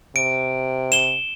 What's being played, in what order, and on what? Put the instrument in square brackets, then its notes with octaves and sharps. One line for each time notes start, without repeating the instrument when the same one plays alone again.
[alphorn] C3 [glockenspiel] D7
[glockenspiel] E7 G7